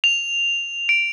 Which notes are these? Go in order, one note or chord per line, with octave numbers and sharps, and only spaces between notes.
F7
D7